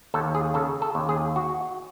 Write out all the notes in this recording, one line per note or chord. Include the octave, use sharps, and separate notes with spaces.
D#2 A4
G#4
C#3 A4
A4
D#2
G#4
F#4